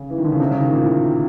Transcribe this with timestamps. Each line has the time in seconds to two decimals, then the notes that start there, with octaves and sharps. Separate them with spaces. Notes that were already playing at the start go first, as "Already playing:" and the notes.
Already playing: C#3
0.10 E3
0.18 D#3
0.24 D3
0.32 C#3
0.40 C3
0.51 C#3
0.61 D#3
0.72 A#2
0.83 A2